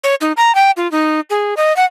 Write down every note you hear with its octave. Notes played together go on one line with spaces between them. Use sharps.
C#5
D#4
A#5
G5
F4
D#4
G#4
D#5
F#5